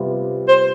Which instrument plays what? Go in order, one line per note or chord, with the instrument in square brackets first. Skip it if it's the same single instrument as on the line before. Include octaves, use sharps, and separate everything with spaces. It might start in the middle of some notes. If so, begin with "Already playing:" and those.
Already playing: [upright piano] C3 G3 B3 F4
[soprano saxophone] C5